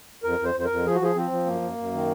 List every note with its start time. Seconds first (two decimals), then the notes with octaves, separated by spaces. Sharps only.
0.23 F2 A#4
0.39 F2
0.44 C5
0.54 F2
0.60 C5
0.65 A#4
0.70 F2
0.85 F3 G#4
0.95 F#4
1.01 F3 G#4
1.15 F3 C4
1.31 F3
1.46 F#2 A#3
1.61 F#2
1.78 F#2
1.93 D#3